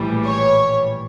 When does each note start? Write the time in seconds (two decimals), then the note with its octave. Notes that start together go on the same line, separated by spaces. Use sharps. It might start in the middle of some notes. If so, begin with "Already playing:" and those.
Already playing: A#1 A2 E3 G3
0.25 C#5